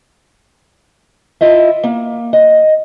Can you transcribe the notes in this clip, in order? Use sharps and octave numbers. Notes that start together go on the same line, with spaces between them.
E4 F4 D#5 E5
A#3
D#5